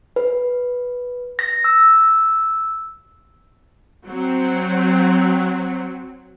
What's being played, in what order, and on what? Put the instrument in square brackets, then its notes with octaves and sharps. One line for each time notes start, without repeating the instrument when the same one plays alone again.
[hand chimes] B4
A#6
E6
[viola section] F#3 C4